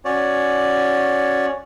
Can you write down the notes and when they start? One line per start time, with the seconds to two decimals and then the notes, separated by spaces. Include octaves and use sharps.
0.05 C#4 F#4 C#5 D5